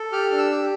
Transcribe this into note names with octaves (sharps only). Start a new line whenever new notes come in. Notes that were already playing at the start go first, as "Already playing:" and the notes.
Already playing: A4
G4 F6
D4
E6
G4